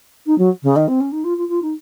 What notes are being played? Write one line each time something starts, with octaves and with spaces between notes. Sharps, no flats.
D#4
F#3
C#3
D#3
C4
C#4
D#4
F4
F4
F4
D#4